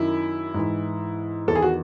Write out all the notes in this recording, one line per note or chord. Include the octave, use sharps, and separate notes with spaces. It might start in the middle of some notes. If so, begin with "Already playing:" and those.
Already playing: F#2 D#3 E4
G#2 E3
E2 D#3 A4
G#4
F#4